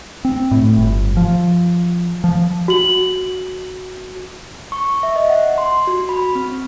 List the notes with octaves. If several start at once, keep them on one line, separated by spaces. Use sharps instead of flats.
C4
A2
G1
F3
F3
F#4 F#7
C#6
E5
D#5
F#5
C6
F#4
B5
C4